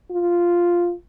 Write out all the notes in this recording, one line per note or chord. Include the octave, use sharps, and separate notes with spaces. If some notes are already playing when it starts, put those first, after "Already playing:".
F4